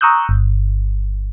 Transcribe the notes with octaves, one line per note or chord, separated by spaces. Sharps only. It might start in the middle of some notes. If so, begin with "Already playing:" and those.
A#5 C#6 D#6 E6 F#6 G6
G1